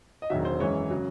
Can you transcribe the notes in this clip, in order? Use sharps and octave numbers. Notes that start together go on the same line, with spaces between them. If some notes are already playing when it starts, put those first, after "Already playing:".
D#5
E1 E2 D#3 F#3 E5
C5
F#2 E3 G#3 C#5
C#3 F#3